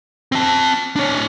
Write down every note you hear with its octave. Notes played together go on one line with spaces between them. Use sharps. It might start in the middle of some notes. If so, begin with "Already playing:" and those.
C4 A5
D4 C#5